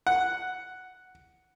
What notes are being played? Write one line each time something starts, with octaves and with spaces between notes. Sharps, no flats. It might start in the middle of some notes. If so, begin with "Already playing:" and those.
F#5